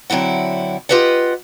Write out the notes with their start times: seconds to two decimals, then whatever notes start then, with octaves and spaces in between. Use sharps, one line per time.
0.10 D3 F#3 C4 E4 F#5
0.89 F4 G4 B4 D#5 F#5